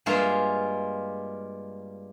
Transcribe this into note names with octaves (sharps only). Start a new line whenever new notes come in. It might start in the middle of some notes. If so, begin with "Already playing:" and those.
G2 G#3 A#3 F4 C#5 E5